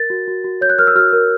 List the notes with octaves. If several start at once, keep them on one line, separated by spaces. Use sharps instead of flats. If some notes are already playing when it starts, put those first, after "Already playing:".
Already playing: A#4 A6
F#4
F#4
F#4
C#5 G6
F#6
A#4 F6
E6
F#4 F6
A#4